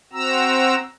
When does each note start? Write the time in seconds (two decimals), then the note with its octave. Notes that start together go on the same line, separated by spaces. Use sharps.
0.13 C4 F#4 A#5 E6